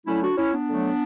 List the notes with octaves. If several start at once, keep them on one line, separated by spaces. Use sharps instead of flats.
D3 F#3 A3 C#4 E4
D4 F#4
C#4 E4
B3 D4
D3 F#3 A3